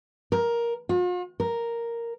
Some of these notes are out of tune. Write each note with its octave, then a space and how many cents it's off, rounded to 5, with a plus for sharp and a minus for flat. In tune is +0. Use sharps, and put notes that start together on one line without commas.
A#4 +10
F4 +45
A#4 +0